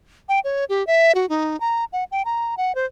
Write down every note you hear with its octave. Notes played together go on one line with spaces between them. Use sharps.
G5
C#5
G4
E5
F#4
D#4
A#5
F#5
G5
A#5
F#5
C5